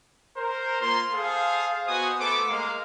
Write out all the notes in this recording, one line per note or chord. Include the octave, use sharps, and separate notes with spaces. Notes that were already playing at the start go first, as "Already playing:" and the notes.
A#4 C5
A#3 F4 A#5 C6
G#4 A4 C5 F5
B3 F#4 C5 D#5 G#5 D#6
A3 B3 A4 C5 D6
G#3 A#3 F5